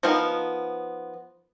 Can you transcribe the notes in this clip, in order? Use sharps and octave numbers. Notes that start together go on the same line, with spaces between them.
F3 B3 D#4 A#4 F5